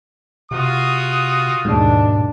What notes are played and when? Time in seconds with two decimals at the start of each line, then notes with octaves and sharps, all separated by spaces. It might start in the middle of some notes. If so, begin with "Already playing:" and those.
0.51 C3 F4 F#4 D#6
1.65 D#2 G#2 B2 D4